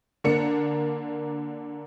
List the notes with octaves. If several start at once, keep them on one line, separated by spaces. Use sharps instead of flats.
D3 A#3 D4 C#7